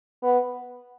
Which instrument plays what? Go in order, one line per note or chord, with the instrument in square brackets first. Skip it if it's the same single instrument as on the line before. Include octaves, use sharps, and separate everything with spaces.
[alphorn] B3